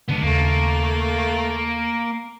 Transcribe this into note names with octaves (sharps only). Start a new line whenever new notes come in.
D3 G#3 B3 D4
D#2 C#3 A3 A#3